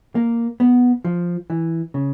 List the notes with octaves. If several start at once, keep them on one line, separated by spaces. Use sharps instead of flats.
A#3
B3
F3
E3
C#3